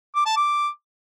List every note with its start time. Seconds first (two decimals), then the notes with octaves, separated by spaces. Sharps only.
0.15 D6
0.26 A5
0.36 D6